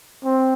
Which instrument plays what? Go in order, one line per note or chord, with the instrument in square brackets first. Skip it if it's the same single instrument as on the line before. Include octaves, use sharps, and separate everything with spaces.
[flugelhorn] C4